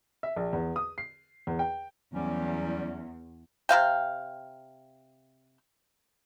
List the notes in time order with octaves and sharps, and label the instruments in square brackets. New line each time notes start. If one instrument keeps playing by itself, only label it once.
[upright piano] E5
A#1
E2
D#6
C7
E2
G5
[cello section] E2 [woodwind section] F#3 G3 C#4
[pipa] C3 C4 F5 G5